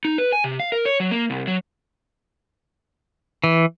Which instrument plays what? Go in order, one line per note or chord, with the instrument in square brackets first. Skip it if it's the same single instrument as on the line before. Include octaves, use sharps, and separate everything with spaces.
[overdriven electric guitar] D#4
B4
G#5
C3
F5
A#4
C#5
F#3
A#3
C2
F#3
[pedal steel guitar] E3